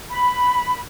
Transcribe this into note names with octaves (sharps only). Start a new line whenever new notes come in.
B5